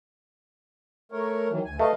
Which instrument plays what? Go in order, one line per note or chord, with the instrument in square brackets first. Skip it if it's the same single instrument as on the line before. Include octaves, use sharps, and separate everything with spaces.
[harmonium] A3 A#4 C#5
D#3 E3 F#3
D2 G#5
[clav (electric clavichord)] A3 [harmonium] B4 D#5 F5